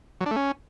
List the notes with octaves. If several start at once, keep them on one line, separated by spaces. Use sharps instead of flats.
F#3
D4
A3
C#4